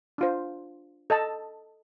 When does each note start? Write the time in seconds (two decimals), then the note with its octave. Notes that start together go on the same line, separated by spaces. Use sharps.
0.18 D4 F4 C5
1.10 A4 D#5 A5